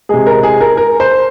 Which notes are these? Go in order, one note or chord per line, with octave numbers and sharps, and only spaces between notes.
C3 G#3 G#4
A#4
G#4
A#4
A#4
C5